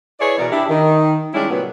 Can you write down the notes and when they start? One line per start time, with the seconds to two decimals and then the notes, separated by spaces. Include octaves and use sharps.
0.19 E4 G#4 B4 C#5 D5 E5
0.38 B2 E3 B3 A#4 D5
0.51 D4 E4 G4
0.69 D#3
1.34 G3 G#3 C#4 D4 E4 G4
1.49 A#2 C#3 F#3 A3 B3